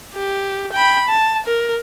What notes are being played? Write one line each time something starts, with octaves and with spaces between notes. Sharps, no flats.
G4
G5 B5
A5
A#4